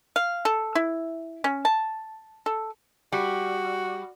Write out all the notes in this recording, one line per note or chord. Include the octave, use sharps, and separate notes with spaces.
F5
A4
E4
C#4
A5
A4
G3 F#4